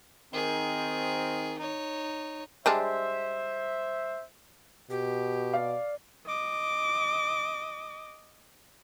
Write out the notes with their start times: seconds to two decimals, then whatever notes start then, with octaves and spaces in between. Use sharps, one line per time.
0.33 D#3 C4 G#4
1.58 D#4 C#5
2.66 G3 G#3 D4 C5 E5
4.90 B2 G4
5.53 D5 F5
6.26 D#5 D6